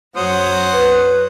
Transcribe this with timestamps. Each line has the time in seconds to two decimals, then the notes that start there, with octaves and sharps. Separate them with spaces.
0.16 F#2 F#3 C5 C#5 F#5 D#6
0.73 B4